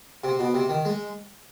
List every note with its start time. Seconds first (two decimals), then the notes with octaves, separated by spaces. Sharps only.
0.24 C3
0.39 B2
0.54 C3
0.69 D#3
0.85 G#3